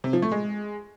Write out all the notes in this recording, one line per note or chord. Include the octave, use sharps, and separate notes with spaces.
C3
F3
A3
G#3